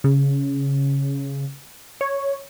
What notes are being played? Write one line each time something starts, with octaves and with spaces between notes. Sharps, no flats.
C#3
C#5